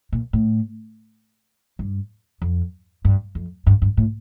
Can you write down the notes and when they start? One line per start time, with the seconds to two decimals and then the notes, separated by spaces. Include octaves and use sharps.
0.13 A#2
0.33 A2
1.79 G2
2.42 F2
3.05 G2
3.35 F2
3.67 G2
3.82 G2
3.97 A2